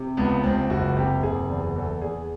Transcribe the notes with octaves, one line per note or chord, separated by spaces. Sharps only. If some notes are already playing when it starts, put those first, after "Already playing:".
Already playing: C3
C#2 B3
C#2 C4
F#1 F#4
C3 G4
F#1 G#4
E2
E2 A4
E2 G#4